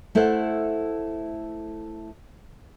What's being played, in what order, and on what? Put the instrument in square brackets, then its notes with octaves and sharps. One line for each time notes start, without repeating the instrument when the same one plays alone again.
[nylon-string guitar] A3 E4 A4 C5 F#5